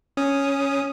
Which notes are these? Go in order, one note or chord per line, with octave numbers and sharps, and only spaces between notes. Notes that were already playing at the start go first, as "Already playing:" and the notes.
C#4 D#6